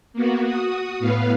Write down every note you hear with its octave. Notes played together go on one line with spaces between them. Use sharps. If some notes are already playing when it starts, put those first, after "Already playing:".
A#3 B3 F#4
F#4 D#6
A2 B3 B4 F5